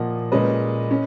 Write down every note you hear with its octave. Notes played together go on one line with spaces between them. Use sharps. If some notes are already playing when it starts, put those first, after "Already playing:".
Already playing: A#2 F3 A#3 D#5 F#5
A#2 G#3 C#4 B4 D#5
C#4